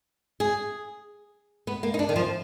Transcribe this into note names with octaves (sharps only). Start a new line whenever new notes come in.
G#4
B3
A#3
D#4
D4
D#3
F3